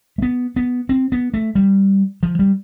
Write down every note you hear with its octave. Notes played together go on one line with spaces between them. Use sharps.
A3
B3
B3
C4
B3
A3
G3
F3
G3